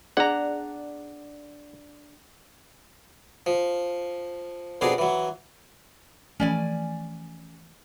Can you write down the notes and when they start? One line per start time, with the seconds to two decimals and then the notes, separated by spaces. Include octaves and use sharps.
0.17 D4 G#4 D5 F#5 A#5
3.46 F3
4.81 F2 B2 D4 G#4 A#5
4.98 E3 F#3
6.40 E3 F3 A3 C#4 D5 G#5